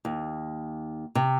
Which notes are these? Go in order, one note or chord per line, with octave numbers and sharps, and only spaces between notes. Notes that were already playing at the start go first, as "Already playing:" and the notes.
D#2
C3